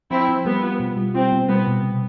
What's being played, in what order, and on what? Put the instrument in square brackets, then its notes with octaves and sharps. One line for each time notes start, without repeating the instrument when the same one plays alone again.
[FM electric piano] F3 [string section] C4 E4
[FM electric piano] F3
[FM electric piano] G3 [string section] B3
[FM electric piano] F4
B2
G3
[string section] C4 [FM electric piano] F4
[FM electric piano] B2
[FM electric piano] G3 [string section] B3
[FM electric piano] B2
C3